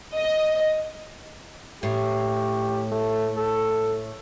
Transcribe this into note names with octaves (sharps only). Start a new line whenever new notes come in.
D#5
A2 G4
A3
A4